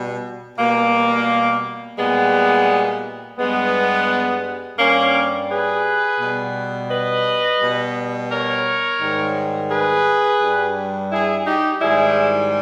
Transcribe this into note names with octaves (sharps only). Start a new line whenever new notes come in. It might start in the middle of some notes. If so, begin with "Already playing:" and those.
Already playing: B2 G3
B2 G3 A#3
A#2 G3 G#3 B3
G2 G3 G#3 B3
G2 G3 A#3 C#4
G#4 B4
B2 G3
B4 D#5
B2 G3
A#4 C#5
G#2 D#3 G3
G#4 B4
G2 G3
E4 G#4
D#4 G4
G#2 D#3 G3 E4 G#4